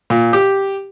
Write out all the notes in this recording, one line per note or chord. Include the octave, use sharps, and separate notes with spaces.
A#2
G4